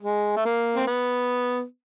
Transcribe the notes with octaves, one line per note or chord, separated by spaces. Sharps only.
G#3
A3
A#3
C4
B3